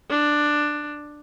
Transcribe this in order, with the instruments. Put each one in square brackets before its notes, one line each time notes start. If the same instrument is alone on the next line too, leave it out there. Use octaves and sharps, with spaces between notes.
[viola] D4